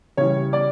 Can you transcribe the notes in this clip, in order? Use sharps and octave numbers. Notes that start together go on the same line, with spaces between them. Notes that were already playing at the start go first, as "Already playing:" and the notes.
C#3 E3 G3 C#5
D5